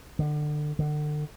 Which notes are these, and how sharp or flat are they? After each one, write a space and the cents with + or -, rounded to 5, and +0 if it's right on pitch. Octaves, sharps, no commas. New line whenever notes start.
D3 +30
D3 +35